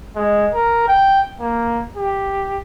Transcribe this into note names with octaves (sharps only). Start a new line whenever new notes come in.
G#3
A#4
G5
A#3
G4